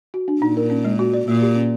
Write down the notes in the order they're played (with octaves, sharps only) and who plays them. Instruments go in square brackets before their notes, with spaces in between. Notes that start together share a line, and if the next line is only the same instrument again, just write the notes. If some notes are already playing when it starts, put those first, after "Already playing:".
[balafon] F#4
D4
[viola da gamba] A#2 [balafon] D#4
[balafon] A#4
C#4
G#3
F#4
D5
[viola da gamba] A#2 [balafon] A#3
[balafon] G4
C#4